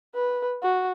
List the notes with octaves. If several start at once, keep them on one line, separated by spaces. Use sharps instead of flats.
B4
F#4